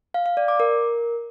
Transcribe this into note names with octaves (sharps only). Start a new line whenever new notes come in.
F5
F5
D5
D6
A#4